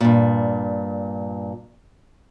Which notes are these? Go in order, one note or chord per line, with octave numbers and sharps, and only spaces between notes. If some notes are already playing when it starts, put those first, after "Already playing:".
G2 A#2